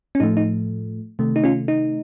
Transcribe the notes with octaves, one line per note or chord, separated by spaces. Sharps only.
C#4
A2 F3 A3 D#4
D#4
C3 D#3 A3
D#4
C#4 F4
D#4